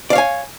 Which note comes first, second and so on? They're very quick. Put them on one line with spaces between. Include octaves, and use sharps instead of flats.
D5 F5 C#5 G#5